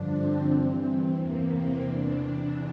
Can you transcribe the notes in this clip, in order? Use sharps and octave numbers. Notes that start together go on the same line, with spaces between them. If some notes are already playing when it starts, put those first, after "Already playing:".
Already playing: G2 D3 F3 D4
C4
G2 E3
E2 C3 E3 A#3
C4
E2 C3 E3 D4